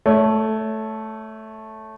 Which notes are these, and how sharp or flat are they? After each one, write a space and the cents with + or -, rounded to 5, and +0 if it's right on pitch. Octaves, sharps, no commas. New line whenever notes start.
A3 -5 C#5 +20